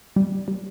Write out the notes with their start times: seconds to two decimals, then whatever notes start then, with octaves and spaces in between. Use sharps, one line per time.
0.16 G3
0.48 G3